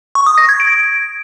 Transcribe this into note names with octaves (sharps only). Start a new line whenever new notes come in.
C#6
D#6
A#6
G#6
D7